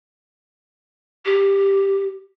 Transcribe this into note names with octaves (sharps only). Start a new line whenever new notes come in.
G4